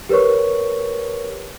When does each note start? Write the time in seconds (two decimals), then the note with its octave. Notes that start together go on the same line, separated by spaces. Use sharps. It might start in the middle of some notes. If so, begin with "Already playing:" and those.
0.09 G4 A#4 B4 C#5 C#6